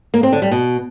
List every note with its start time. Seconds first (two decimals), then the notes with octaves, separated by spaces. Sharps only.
0.14 A#3
0.23 C4
0.33 D3
0.42 G3
0.51 B2